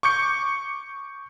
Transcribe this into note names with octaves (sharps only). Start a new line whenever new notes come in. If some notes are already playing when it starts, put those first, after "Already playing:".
C#6 D6 G6 C#7